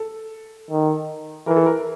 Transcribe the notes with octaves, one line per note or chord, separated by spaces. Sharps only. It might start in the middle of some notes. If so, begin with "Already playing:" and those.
Already playing: A4
D#3
E3 A#4
A4
A#4